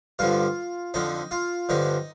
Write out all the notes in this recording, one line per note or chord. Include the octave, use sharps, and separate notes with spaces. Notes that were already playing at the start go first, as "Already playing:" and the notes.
G2 D3 F3 F4
F2 D3 F3 D#4
F4
G2 D3 F3 D#4